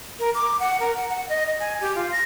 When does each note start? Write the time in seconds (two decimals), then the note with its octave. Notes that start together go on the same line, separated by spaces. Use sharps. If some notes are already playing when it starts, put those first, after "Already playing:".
0.19 A#4
0.35 D6
0.60 F#5
0.80 A#4
0.96 F#5
1.10 F#5
1.29 D#5
1.47 D#5
1.60 G#5
1.81 G4
1.95 F4
2.12 A#6